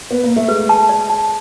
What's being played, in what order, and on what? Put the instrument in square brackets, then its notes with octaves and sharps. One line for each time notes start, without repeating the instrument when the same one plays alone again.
[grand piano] B3
A#3
A3
[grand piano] G#3 [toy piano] B4
[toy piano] A5
D5
A5